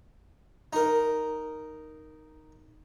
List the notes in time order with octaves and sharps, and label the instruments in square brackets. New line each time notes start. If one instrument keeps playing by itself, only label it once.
[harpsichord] D#4 A#4